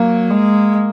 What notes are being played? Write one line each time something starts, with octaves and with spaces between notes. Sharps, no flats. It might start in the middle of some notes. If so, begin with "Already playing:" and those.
Already playing: F#3 A#3
G#3